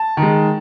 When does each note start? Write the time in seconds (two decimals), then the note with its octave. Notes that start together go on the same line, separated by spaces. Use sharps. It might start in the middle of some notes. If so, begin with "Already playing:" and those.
Already playing: A5
0.17 D#3 G#3